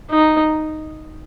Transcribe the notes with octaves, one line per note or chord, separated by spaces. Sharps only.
D#4